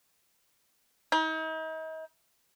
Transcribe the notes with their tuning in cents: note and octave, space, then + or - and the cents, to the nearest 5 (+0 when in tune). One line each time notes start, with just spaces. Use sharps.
D#4 +40